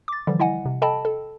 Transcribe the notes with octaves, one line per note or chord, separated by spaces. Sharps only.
D6 A6
D3 E3 F3 G3
E4 D#5 F#5 G#5
C3
A4 D#5 G5 A5 B5
A4